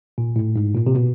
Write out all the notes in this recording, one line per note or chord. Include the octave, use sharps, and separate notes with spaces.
A#2
A2
G#2
A#2
C3
B2